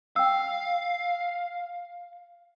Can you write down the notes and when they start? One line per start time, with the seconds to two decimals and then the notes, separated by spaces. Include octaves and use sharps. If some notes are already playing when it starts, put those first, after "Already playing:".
0.16 F5 G5 E6